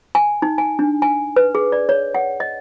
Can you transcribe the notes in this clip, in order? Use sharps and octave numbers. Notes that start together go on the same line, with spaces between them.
G#5
D#4
G#5
D4
G#5
B4
G#4
D5
C#5
F#5
D#5